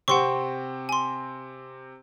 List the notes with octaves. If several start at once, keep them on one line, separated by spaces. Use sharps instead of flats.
C3 C4 F#5 C6 C#6
G#5 C6